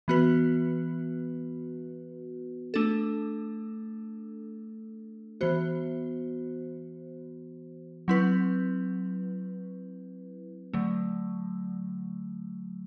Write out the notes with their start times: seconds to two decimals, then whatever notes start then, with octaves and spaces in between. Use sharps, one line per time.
0.08 E3 B3 F#4 B4
2.74 A3 D4 A4
5.41 E3 B3 F#4 C5
8.08 F#3 C4 E4 B4
10.73 D3 F#3 A3